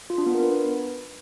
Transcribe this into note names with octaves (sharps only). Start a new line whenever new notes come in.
F4
D4
B3
A#4
B4